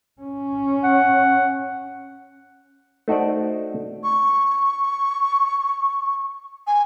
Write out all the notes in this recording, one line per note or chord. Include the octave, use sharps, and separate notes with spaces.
C#4
F#5
A3 D#4 F#4 C5 D5
C#6
G#5